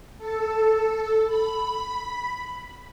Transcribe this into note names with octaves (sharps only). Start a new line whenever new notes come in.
A4
B5